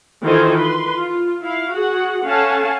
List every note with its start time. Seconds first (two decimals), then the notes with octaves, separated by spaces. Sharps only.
0.23 D#3 E3 F4 A4 C5 G#5
0.57 B4 C6
0.96 F4
1.44 E4 F5
1.73 F#4 G#4 F#5
2.26 C#4 A4 F5 F#5 G#5 A5